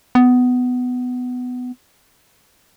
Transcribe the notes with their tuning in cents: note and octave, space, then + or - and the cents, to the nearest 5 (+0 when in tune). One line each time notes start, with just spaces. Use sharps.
B3 +15